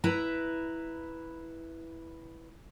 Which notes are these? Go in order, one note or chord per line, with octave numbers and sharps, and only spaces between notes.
E4 B4 A#5